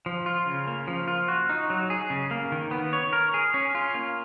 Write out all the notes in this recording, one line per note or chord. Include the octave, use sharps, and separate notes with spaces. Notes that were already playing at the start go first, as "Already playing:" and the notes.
F3
F4
C#3
A#3
F3
F4
F#4
D#4
F#3
G#4
C#3
A#3
D#3
B3
C#5
A#4
G#4
C#4
F4
A#3